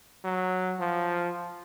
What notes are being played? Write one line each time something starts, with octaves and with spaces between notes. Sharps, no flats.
F#3
F3